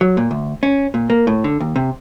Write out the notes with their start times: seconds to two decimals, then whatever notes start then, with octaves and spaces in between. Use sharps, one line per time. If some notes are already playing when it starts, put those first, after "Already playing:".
0.01 F#3
0.17 A#2
0.31 D2
0.63 C#4
0.94 A#2
1.10 A#3
1.27 A2
1.44 D3
1.60 D#2
1.76 C3